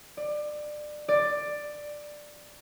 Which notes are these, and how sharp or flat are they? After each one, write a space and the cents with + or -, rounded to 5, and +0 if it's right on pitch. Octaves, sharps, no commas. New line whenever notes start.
D5 +25
D5 +10